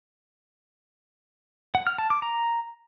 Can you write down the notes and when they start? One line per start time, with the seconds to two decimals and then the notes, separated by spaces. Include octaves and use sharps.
1.75 F#5
1.87 F6
1.98 A5
2.10 D6
2.22 A#5